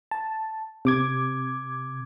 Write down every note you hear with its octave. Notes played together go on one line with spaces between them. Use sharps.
A5
C3 D6 G#6